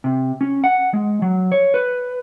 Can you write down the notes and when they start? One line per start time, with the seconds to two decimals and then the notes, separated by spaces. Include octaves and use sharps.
0.04 C3
0.41 C#4
0.64 F#5
0.94 G#3
1.22 F#3
1.52 C#5
1.74 B4